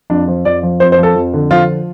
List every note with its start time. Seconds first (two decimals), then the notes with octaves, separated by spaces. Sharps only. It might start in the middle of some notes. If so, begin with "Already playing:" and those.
0.10 F2 D4
0.28 F3
0.45 F2 D5
0.63 F3
0.80 F2 C5
0.92 C5
0.98 F3
1.03 A4
1.16 F2
1.34 D3
1.50 F3 F4